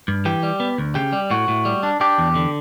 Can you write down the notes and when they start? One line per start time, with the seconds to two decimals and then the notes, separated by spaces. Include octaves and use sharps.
0.08 G2
0.25 E3 G4
0.43 G3
0.60 B3
0.78 D2
0.95 C#3 G4
1.13 G3
1.31 A2 F#4
1.48 A2
1.65 G3
1.83 D4
2.01 D4 G4
2.18 E2
2.35 D3